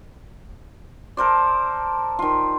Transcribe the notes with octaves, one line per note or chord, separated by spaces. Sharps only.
A4 A#4 C5 D5
D#3 F4